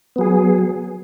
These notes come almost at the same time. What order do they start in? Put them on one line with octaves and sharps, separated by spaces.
B3 F#3 G#4